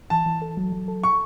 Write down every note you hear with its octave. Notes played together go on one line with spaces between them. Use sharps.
E3 A5
E3
A4
F#3
F#3
A4
A4 C#6